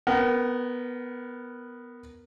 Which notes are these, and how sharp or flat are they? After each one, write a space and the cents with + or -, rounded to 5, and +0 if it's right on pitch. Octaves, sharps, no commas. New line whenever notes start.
B3 +0 A#4 +0 F#5 +45